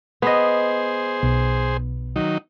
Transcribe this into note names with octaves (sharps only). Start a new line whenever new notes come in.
B3 G#4 C5 D#5
B1
D#3 F#3 D#4